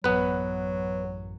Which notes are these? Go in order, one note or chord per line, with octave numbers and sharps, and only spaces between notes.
A1 F#2 F#3 B3 B4